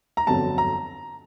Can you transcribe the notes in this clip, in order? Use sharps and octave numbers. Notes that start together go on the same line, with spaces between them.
A#5
G1 F2 D3 F#3 A5
A#5